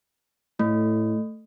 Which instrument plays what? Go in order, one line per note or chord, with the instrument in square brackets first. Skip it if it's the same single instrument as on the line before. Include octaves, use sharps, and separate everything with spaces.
[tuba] A2 [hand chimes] A3